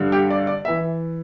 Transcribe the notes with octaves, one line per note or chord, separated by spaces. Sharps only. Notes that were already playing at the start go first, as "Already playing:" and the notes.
Already playing: G2 D3
G4
D5
D5
E5
E3